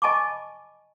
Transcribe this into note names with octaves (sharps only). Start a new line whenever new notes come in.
D#5 G#5 A5 B5 C#6 D6